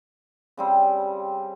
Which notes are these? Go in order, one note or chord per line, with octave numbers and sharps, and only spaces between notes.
C#3 G3 C4